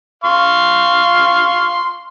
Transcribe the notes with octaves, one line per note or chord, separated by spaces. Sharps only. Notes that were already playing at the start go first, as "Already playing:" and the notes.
F5 C6 C#6